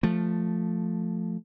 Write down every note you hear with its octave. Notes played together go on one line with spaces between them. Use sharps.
F3 A3